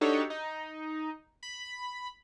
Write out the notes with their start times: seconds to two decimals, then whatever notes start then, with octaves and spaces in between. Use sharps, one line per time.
0.01 D4 D#4 F#4 G4 A4 C#5
0.30 D#4
1.43 B5